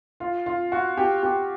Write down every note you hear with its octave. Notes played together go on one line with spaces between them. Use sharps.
F4
F4
F#4
G4
G4